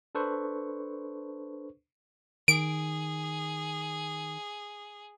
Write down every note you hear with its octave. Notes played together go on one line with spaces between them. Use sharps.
D4 A4 B4 C5 C#6
D#3 G#4 D7